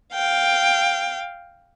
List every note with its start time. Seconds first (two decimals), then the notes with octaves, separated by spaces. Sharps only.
0.13 F5 G5